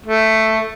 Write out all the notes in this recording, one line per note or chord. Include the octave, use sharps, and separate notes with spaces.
A3